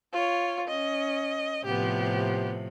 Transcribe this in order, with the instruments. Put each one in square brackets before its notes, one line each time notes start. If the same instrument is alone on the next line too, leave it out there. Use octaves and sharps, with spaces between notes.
[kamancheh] F4 C#5
[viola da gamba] C#4 [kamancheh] D#5
[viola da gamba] A2 C3 F3 [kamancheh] B3 G4